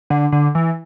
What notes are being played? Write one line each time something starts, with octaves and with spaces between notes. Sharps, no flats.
D3
D3
E3